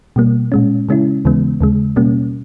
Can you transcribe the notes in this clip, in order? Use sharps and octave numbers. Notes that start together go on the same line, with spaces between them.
B2 G3 A#3
A#2 G#3 C#4
C#3 G#3 C#4 E4
D#2 C#3 E3 G#3 B3
D#2 C#3 G#3
B2 G3 A#3 C#4